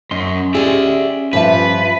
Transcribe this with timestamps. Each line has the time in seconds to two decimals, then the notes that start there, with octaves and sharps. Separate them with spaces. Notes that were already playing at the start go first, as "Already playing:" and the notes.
0.11 F#2 C#4 D#5 C6
0.55 G4 G#4 D5 E5
1.33 G2 F3 B4 E5